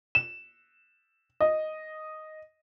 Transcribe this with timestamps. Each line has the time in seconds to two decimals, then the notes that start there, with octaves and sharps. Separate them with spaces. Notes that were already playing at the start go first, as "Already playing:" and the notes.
0.15 E7
1.41 D#5